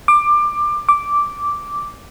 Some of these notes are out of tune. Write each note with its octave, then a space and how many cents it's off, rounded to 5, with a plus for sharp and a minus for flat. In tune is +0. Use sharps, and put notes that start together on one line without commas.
D6 +20
D6 -5